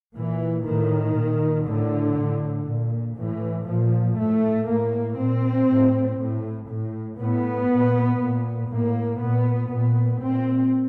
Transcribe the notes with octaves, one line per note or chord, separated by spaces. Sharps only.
A#2 E3
A2 D#3
A#2
A2 D3
A2
A#2
A2 E3
A#2 F3
A2 A3
A2 A#3
A#2 C4
A2
A2
A2
A2 B3
A#2
A#2
A2 A#3
A#2 B3
A#2 B3
A#2 C4